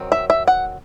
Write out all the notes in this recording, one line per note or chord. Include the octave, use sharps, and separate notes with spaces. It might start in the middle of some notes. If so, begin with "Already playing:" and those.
Already playing: D#3 F#3 C4
E5
E5
F#5